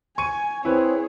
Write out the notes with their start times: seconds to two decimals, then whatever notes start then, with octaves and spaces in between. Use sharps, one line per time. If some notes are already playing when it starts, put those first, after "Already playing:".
0.18 G#5 C#6 D#7
0.65 C4 E4 G#4 B4 C#5